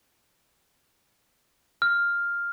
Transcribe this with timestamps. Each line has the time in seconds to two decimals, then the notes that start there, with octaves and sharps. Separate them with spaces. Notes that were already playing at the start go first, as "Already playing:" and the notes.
1.82 F6